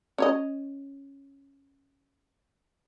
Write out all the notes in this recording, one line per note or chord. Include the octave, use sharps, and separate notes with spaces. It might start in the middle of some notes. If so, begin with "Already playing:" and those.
C#4 C#5 D#5